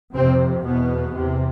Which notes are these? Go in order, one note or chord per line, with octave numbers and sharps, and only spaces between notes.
F2 C3 C4
E2 B2 B3
E2 C3